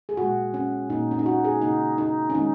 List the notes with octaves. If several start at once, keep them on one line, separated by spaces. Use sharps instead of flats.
G#4
A#2 G#3 F#4
C#4
A#2 A#3 D#4
C#4
D#4
F#4
G#4
C#3 A#3 D#4
D#4
C#4
D#3 G#3 D#4